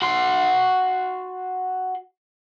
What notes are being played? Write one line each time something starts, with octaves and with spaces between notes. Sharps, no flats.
F#4 C6